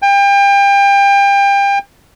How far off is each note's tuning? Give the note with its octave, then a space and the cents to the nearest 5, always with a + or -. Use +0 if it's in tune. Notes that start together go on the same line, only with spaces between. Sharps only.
G5 +30